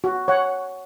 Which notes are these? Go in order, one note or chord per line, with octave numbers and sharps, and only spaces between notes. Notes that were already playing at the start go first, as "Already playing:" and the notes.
F#4
C#5 F#5